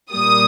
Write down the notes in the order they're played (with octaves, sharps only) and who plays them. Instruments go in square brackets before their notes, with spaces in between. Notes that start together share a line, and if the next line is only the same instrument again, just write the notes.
[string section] A#2 G3 A#3 D#6